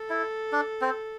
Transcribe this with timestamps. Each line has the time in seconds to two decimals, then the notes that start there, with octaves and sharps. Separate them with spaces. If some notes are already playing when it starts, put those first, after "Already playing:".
Already playing: A4
0.10 E4
0.52 D4
0.81 C4